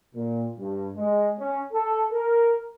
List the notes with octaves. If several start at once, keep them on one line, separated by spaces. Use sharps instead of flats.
A#2
G2
G#3
C#4
A4
A#4